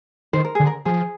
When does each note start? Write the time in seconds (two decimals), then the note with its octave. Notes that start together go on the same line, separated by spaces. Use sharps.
0.33 D#3 C5
0.45 A#4
0.55 D3 G#4
0.67 A#4
0.85 F3 G#4